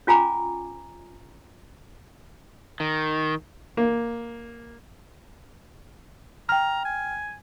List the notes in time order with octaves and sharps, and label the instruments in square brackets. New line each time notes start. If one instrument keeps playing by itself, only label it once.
[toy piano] C#4 F4 G#5 A#5 D6
[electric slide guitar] D#3
[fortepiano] A#3
[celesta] G5 F6 [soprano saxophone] A#5
[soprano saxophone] G#5